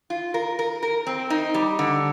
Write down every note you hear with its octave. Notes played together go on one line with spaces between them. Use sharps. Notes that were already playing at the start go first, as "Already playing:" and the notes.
F4
A#4
A#4
A#4
C4
D#4
G3
D3